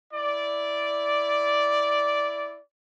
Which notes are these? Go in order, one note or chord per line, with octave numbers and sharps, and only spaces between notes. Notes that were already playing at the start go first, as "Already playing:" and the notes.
E4 D5